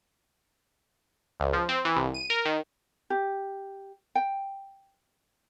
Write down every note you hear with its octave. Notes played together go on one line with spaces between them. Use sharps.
C#2
F3
C4
E3
C2
D#7
A#4
D#3
G4
G5